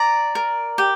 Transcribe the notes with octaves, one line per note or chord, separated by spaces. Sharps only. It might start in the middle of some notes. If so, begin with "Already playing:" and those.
Already playing: D5 A#5
A#4
G4